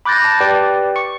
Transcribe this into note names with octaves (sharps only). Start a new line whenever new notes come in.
B5 D6 F#6 G6 A6 A#6
A5 D6
G4 B4 D5 G5
C#6 C#7